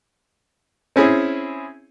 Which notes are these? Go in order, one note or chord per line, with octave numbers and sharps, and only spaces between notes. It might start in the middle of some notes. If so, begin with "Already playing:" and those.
C4 C#4 E4 G#4